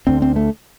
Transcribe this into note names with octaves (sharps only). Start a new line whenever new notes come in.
D2 D3 C4
C4
A3